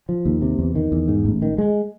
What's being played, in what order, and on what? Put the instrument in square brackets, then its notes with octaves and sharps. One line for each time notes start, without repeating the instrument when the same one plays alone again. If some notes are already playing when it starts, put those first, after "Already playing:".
[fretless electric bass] F3
D#2
C3
E2
D#3
E2
G#2
A1
D#3
G#3